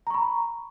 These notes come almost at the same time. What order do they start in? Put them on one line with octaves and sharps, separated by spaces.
A#5 C#6 B5